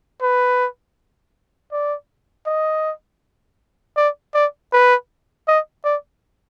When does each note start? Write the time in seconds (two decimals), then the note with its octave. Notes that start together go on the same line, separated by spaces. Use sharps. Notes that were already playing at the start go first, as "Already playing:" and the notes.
0.22 B4
1.72 D5
2.46 D#5
3.96 D5
4.34 D5
4.72 B4
5.47 D#5
5.84 D5